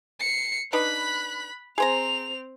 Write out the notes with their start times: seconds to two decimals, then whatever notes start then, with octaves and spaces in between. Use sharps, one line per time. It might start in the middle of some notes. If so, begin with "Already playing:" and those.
0.20 C7 C#7
0.73 D4 D#4 B4 B5 F#6
1.78 C4 G#4 C5 A#5 F7